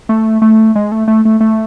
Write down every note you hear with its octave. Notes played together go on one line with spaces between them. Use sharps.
A3
A3
G#3
A3
A3
A3
A3